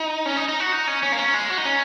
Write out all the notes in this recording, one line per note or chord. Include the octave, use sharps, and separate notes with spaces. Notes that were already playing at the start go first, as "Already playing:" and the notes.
Already playing: D#4
C#4
D#4
D#4
F#4
D#4
C#4
C#4
A#3
C#4
G#3
F#4
D#4
C#4